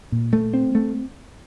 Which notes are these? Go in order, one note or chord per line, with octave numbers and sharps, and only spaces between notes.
A#2
A3
C4
A3